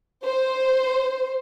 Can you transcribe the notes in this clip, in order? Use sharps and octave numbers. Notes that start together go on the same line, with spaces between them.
C5